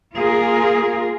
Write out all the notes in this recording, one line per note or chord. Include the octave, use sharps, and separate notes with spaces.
A#3 F4 G#4 A#4